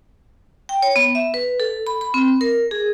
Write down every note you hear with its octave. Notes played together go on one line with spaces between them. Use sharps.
G5
C#5
B3
E5
B4
A4
B5
B5
C4
A#4
G#4